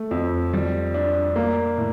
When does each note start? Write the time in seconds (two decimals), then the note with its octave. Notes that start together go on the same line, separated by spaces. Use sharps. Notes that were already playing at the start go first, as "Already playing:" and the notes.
Already playing: A3
0.11 F2
0.53 G3
0.94 D4
1.36 A#3
1.78 A2